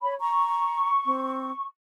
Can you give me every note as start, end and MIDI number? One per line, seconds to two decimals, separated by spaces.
0.02 0.13 73
0.02 0.13 83
0.20 0.90 82
0.20 1.64 85
1.06 1.51 60